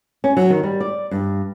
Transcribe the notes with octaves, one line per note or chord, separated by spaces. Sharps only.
C#4
F#3
D#3
G3
D5
G2